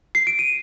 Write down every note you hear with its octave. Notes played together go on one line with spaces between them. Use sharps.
C7
D7
D#7